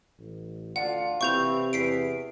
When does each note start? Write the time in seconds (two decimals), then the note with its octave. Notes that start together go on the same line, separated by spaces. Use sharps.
0.18 A1
0.76 D2 D4 F4 F#5
1.21 C3 E3 C4 E4 C#6 G6 F7
1.73 E2 B6 C7 D7